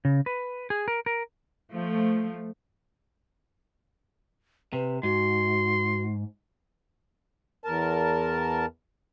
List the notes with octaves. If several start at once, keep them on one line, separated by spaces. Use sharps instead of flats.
C#3
B4
G#4
A#4
A#4
F3 A3
C3 B4
G#2 F#4 C6
E2 A#4 A5